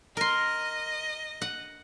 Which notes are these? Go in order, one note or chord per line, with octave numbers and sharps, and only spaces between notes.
A#4 D#5 C6 A#6
F#5